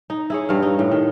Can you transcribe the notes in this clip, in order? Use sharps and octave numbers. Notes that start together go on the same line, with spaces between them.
D#4
E4 G#4 C#5
G2 F5
D#4
A2
D#3